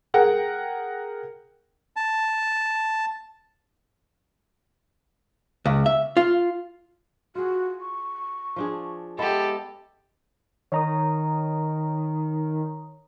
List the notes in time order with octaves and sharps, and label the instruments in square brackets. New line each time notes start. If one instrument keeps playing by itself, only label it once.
[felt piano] G#4 A#4 F#5 G5
[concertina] A5
[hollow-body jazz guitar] C#2
E5
F4
[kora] F4 G#4 [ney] F#4
[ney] C#6
[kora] F3 D4 G#4
[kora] G#3 B3 E4 [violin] G4 A4
[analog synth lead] D#3 [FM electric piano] C#5 A#5 D#6